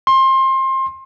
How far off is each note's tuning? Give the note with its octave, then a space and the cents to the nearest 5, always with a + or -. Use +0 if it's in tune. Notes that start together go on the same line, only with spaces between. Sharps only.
C6 +25